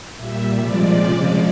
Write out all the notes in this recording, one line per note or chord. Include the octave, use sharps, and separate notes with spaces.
A#2 G3 E5
C3 F3 G#3 D5
C#3 F3 G#3